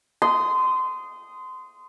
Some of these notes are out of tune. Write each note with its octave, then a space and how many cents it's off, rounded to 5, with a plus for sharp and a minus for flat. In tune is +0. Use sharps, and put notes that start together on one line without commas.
C6 -25 D#6 +0